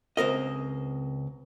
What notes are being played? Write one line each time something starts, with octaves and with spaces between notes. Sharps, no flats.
C#2 C4 A#4 D#5